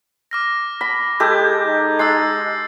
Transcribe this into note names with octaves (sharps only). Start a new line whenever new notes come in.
D6 F6 A#6
B5
G#3 G4 A4 G6 G#6
D#4
G#3 E6 A6 C7